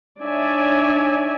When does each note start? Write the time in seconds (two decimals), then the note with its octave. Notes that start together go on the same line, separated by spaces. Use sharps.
0.21 D4 D#4 C#5 D5 E5 G#5